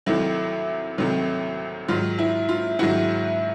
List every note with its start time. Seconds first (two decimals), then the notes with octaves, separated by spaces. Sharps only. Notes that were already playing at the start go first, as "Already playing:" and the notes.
0.06 C2 C3 D#3 F#3 A3 E4
0.98 C2 C3 D#3 F#3 A3
1.88 G#2 D#3 F#3 F4
2.19 E4
2.49 F4
2.79 G#2 D#3 F#3 E4 F#4